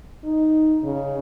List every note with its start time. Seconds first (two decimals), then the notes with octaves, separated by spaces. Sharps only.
0.24 D#4
0.83 C#3